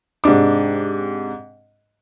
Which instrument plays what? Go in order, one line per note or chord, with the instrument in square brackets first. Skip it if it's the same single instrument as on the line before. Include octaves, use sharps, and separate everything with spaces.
[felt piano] G#2 C3 D4 D6